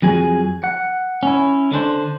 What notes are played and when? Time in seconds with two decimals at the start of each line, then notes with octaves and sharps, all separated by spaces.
0.02 F2 F#3 G#4 G#5
0.64 F#5
1.23 C#4 E4
1.72 D3 D4 C5